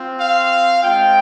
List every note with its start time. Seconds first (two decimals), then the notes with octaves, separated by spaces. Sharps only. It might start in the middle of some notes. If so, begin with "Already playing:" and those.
Already playing: C4 F4
0.18 F5
0.83 G#3 C4 F4 G5